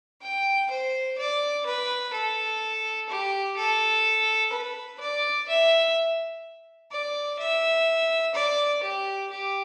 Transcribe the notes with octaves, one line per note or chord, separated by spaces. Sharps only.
G5
C5
D5
B4
A4
G4
A4
B4
D5
E5
D5
E5
D5
G4
G4